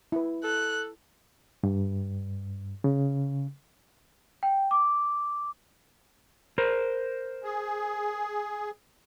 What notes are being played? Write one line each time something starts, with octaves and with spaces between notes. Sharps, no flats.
E4 B4
A4 F#6
G2
C#3
G5
D6
A#4 C5
G#4